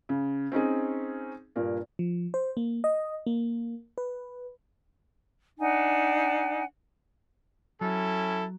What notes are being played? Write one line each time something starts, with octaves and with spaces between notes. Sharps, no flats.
C#3
C4 C#4 D#4 G#4
G2 A#2 A#3
F3
C5
A#3
D#5
A#3
B4
D4 D#4 F#5 G#5
F#3 C#4 E4 A4